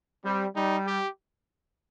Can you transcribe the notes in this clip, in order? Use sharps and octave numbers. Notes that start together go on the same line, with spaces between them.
G3 C4
G3 D#4
G4